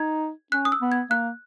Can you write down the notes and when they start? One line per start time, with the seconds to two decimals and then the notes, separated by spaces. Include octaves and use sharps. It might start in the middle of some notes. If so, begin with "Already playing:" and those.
Already playing: D#4 G#6
0.52 C#4 F#6
0.65 D#6
0.72 E6
0.82 B3
0.92 G#6
1.10 A#3 F#6